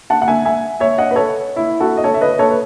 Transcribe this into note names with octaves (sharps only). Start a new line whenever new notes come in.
F#5 A5
F#5
E5 G#5
E5 G#5
C#5 E5
D#5 F#5
B4
A4 C#5
E4
F#4 A4
D#5
A4 C#5
E5
B4 D#5
A4 C#5
B4